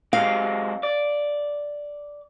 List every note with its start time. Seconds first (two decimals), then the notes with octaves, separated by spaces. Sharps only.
0.13 F#3 G#3 C4 F5
0.83 D5